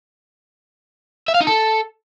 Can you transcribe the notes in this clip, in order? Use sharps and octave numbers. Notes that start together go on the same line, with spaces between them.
E5
F5
D#4
A4